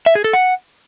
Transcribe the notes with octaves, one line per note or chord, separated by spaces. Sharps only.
E5
G#4
A4
F#5